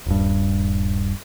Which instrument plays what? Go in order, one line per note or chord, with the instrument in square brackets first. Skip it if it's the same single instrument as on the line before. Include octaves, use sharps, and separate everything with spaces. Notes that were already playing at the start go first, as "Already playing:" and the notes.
[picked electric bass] D#1 G2